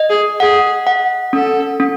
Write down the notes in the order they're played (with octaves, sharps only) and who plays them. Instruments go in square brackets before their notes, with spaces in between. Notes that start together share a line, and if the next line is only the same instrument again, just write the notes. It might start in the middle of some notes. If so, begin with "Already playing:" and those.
Already playing: [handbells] D#5
[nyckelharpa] G#4
[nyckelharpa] G#4 [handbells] F#5
[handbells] F#5
[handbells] C#4 [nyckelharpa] A4
[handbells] C#4